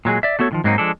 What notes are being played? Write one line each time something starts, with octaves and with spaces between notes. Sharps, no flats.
A#2 F#3 G#3 G#4
D5 E5
A3 B3 F#4 A4 C#5
A2 D#3 F3
G#2 F#3 A#3 C4 D#4
F3 G#3 D4 A4